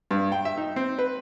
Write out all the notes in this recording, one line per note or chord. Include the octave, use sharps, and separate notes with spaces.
G2
G5
E5
D#4
C4
B4